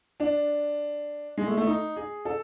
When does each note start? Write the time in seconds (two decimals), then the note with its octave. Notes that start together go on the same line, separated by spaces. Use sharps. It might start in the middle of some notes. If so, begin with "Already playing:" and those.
0.20 D4
1.38 G#3
1.47 A3
1.57 A3
1.67 D#4
1.96 G#4
2.25 A4